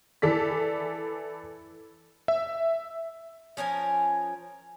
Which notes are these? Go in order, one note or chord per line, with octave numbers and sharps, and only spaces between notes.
E3 A4 D5 B6
E5
F3 C#4 A#4 G#5